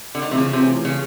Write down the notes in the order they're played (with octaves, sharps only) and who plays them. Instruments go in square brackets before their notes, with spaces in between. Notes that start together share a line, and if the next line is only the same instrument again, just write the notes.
[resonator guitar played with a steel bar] D3
[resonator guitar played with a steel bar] D#3 [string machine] E3 A3 C#4 F4 G#4
[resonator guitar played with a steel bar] C3
C#3
C3
C#3